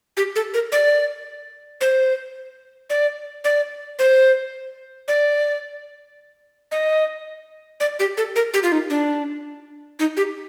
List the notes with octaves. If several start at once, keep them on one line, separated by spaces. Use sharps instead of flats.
G4
A4
A#4
D5
C5
D5
D5
C5
D5
D#5
D5
G4
A4
A#4
G4
F4
D#4
D4
D#4
G4